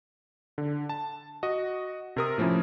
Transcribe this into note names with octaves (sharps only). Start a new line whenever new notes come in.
D3
A5
F#4 D#5
C3 A#4 D#6
A2 F3 A#3 C#4 E4